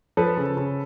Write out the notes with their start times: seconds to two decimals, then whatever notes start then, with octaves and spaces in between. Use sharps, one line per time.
0.17 F3 A4 B4
0.37 C#3
0.57 C#3